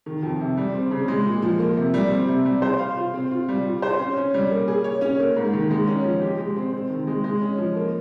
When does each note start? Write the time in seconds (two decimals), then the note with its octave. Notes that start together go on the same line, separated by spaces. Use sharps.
0.06 D#3
0.22 F2
0.40 C3
0.57 G3
0.74 C4
0.91 C#3
1.08 G#3
1.25 A#2
1.42 F3
1.59 A#3
1.77 C3
1.94 G3
2.11 C4
2.28 C3
2.45 G3
2.62 C5
2.79 F5
2.97 F4
3.14 C4
3.31 F4
3.49 G3
3.66 F4
3.82 C5
3.99 C#4
4.17 C#4
4.34 G3
4.51 A#3
4.68 G#4
4.84 C#5
5.01 C#4
5.19 A#3
5.36 G#2
5.53 D#3
5.71 G#3
5.88 C#4
6.04 F3
6.21 G4
6.38 G#3
6.56 C4
6.73 C4
6.90 D#3
7.07 G#3
7.24 G#3
7.42 C#4
7.58 F3
7.76 A#3